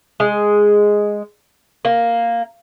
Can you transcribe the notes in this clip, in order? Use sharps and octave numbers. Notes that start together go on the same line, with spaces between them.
G#3
A#3